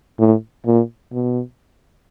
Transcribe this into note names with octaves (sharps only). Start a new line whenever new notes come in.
A2
A#2
B2